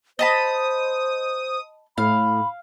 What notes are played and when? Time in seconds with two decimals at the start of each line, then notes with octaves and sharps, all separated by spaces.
0.19 C5 D#5 A5 B5 D#6
1.98 A2 F5 B5